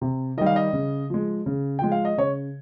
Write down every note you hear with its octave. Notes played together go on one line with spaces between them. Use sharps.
C3
D#3 G3 D#5
F5
D#5
C#3
F3 G#3
C#3
F3 G#3 G5
F5
D#5
C#3 C#5